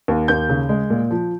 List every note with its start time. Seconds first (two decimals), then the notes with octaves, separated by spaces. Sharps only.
0.08 D#2
0.28 D#2 G6
0.49 C#3
0.69 G#3
0.90 A#2
1.11 F3